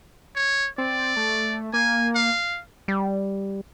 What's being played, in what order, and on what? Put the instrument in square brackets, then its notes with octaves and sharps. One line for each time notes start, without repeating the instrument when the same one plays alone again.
[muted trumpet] C#5
[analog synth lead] C4 [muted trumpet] D5
[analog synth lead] A3
[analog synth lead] A#3 [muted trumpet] G#5
[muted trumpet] F5
[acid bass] G3